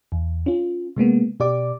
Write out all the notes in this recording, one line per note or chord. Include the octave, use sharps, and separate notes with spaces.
E2
C#4 F4
C3 G#3 A#3 B3
B2 G4 D5 D6